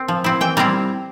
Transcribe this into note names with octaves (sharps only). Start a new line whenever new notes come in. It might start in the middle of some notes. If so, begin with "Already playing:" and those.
Already playing: C4
F3
C4 E4
E3 G5
G3 C4 E4 A#5